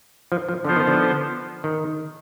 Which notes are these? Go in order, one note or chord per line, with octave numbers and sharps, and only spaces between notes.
F3
F3
D3 F3 B3 F4 C5
D#3
D3
D#3